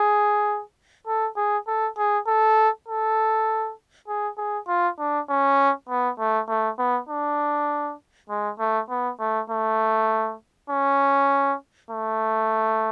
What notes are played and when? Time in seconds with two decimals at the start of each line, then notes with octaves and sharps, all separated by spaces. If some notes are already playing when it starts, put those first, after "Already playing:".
Already playing: G#4
1.08 A4
1.37 G#4
1.68 A4
1.98 G#4
2.27 A4
2.88 A4
4.08 G#4
4.38 G#4
4.68 F4
4.99 D4
5.29 C#4
5.89 B3
6.19 A3
6.49 A3
6.79 B3
7.09 D4
8.30 G#3
8.59 A3
8.90 B3
9.20 A3
9.50 A3
10.70 C#4
11.91 A3